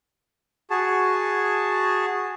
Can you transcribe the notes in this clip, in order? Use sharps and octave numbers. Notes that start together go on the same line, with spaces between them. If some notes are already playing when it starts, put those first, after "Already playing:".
F#4 G#4 A5